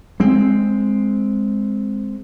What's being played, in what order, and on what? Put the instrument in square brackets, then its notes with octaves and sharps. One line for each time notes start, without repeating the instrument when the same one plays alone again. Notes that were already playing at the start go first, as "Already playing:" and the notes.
[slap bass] G#3 C4